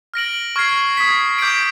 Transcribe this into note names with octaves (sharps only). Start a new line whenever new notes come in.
F6 A#6 D7 F#7
C#6 F6 G#6 C7
D#6 G#6 B6
D6 G6 B6 D7